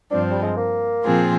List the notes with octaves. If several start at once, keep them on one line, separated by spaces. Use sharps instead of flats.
G2 F3 C4 D4
G3
G#3
A#3
A#2 F3 C4 F4 G#4